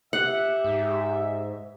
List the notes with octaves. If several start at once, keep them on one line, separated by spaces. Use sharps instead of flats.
G4 E5 F#5
G#2